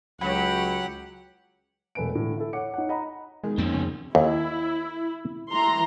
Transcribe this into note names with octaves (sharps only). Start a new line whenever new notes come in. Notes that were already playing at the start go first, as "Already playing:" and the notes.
C#2 F#3 G4 F#5 B5
E1 A3 B4 G#5 D7
A2 D3 E3
E4 A4
C#5 F#5 D6 C#7
D#4 C#5 F#5
D#5 F#5 A#5 B5
B2 D#3 G#3 G#4
F2 F3 A#3 C4 C#4
C#3
D#2 E4
E3 A#5 C6